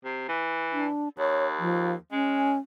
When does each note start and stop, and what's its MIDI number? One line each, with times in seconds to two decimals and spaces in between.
0.05 0.24 48
0.29 0.87 52
0.73 1.09 62
1.18 1.93 39
1.18 1.47 73
1.59 1.94 53
2.12 2.53 56
2.12 2.58 61